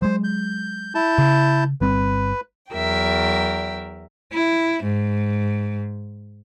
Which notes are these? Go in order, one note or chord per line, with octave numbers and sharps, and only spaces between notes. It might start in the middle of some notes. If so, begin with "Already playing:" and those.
F#3 G#3 C5
G6
E4 A5 G6
C#3
G1 G3 C4 B4
E2 F#3 A#4 E5 G5
E4
G#2